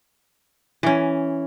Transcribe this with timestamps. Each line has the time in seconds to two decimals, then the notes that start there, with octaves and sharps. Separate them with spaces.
0.83 E3 C#4